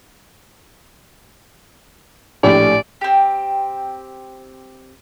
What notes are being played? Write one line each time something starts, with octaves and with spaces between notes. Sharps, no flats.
A#1 A2 G4 D5
C4 G4